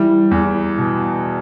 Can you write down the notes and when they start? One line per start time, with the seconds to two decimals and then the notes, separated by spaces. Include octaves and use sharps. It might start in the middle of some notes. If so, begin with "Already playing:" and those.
Already playing: E3 G3
0.31 E2
0.78 B2